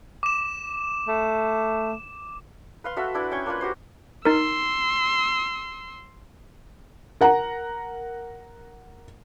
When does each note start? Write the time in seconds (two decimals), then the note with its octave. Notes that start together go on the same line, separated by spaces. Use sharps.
0.23 D6 E7
1.08 A3
2.84 B4 F5 C6
2.96 F#4 A4 E5 F#5
3.14 D4 E4 B4
3.31 C#4 G5 G#5 C#6
3.46 A#3 D4 F4 B4
3.61 F#4 G4 C5
4.25 D#4 A#4 C6 E6
7.21 A#4 F#5 A#5